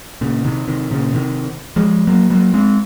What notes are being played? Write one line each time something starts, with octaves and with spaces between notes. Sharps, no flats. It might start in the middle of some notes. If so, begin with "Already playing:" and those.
A#2 C#3
C3 D#3
C3 D#3
A#2 C#3
C3 D#3
F3 G#3
F#3 A#3
F#3 A#3
G#3 C4